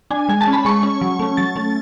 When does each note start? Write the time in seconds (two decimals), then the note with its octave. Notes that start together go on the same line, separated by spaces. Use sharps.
0.11 D4 G#5
0.29 G#3 G#5
0.41 A5
0.47 C#4
0.53 B5
0.65 G#3 C#6
0.83 C#4
1.01 F#3
1.20 A3 C#4
1.37 F#3 A6
1.56 A3 C#4